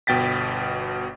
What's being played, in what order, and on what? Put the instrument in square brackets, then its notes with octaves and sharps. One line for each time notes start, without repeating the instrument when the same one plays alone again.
[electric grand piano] G1 B2 G5 A6 B6